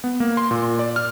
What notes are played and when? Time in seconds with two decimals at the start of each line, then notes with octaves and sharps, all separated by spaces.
0.04 B3
0.20 A#3
0.37 C6
0.51 A#2
0.79 D5
0.96 F6